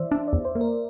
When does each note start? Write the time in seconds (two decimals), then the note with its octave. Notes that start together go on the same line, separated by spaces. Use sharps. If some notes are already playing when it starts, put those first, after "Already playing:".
Already playing: E3 C5 D5 E5
0.11 D4 E5
0.28 D5
0.33 E2
0.45 C5
0.55 A#3
0.61 A#4